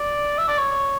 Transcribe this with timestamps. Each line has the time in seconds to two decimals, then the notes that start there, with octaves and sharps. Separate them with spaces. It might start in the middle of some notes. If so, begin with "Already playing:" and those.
Already playing: D5
0.38 E5
0.48 D5
0.58 C#5